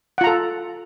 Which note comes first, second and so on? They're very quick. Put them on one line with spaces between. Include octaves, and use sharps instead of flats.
F#5 F4 A#5 A4